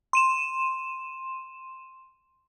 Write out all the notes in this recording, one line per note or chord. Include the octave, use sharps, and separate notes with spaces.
C6 D#7 E7